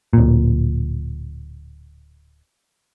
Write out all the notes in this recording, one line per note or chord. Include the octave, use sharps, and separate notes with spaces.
D1 A#2